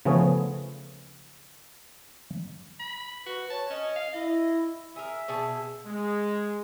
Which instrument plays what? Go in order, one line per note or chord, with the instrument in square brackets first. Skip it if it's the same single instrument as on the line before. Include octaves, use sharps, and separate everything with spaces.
[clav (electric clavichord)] C#3 F3 A3 B3 C#4 G#4
[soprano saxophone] B5
[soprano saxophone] F#4 [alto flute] B4
[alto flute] C#5 [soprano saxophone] A5
[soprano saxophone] C#4 [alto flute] D#5
[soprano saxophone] F5
[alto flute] E4 [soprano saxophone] D#5
[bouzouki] G#4 A#4 [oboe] E5
[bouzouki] B2 G#4 A5
[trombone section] G#3